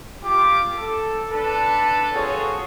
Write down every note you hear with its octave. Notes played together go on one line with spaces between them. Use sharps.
F4 G4 D6
A4
D4 A4 B4 A5
C4 F4 F#4 G#4 A4 C#5